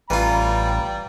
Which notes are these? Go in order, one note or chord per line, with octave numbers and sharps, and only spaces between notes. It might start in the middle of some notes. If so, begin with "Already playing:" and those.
A1 E3 G3 F4 A#5